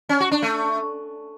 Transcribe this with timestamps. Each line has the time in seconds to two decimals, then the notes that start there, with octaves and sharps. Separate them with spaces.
0.09 C#4
0.20 F#4
0.31 D4
0.42 A3